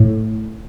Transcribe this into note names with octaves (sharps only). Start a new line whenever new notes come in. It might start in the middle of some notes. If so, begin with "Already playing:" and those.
Already playing: A2